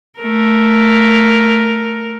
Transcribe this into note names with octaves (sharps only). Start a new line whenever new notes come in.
A3 A#4